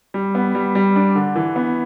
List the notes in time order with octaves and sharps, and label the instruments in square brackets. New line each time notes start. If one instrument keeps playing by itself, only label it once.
[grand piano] G3
B3
G3
G3
D4
D3
E3
B3